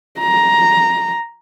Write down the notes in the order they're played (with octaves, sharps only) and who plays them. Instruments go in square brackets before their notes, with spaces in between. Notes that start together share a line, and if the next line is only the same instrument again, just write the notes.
[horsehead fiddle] A#5